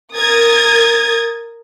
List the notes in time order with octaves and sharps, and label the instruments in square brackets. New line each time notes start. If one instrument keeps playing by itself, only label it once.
[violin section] A#4 D#6 G#6 A6